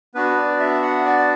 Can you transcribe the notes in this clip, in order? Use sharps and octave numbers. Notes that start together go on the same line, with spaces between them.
B3 D4 F#4 B4
D5
E5
F#5
D5